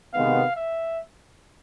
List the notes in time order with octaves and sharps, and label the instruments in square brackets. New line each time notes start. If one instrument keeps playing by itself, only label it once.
[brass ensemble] C3 D#3 G#3 B3 [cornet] F5
[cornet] E5